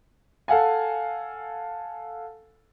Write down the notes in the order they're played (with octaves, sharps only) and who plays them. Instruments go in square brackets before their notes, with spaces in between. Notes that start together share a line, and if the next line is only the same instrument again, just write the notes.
[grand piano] A4 F5 F#5 G#5